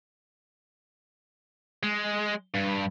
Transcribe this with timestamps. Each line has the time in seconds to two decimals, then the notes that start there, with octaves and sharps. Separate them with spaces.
1.83 G#3
2.55 G2